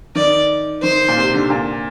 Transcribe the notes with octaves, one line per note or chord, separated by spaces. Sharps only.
D#3 D5
D#3 C5
A#2
C3
D3
A#2